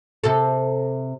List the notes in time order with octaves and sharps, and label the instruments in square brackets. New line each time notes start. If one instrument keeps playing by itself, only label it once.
[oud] C3 A4